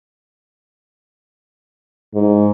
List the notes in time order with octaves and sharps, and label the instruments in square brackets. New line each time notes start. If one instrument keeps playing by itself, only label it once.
[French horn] G#2